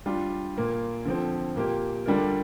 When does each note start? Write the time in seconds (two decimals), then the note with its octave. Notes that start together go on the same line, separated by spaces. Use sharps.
0.06 G3 D4 F4
0.56 A#2 A#3 F4
1.05 D3 F3 C4
1.56 A#2 A#3 G4
2.06 D3 G3 D4 F4 A#4